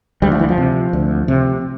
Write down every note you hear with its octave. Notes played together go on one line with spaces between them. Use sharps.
D2 G3
F3
E3
F3
C3
D2
C3